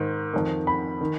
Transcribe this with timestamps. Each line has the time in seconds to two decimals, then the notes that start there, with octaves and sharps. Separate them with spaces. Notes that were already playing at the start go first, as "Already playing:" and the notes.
Already playing: G#2 D#3
0.34 F2 D#3
0.67 B5
1.01 D#3